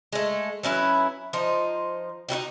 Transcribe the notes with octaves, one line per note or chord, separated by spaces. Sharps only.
G#3 A3
F#3 C#4 E4 B4
F3 D#4 C5
D#4 E4 F#4 G4